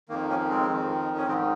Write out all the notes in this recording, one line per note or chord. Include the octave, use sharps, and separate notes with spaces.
F2 D#3 A#3
A#3 C#4
G#3 C4
F2 D#3
C#4
G#2 D#3 G#3 C4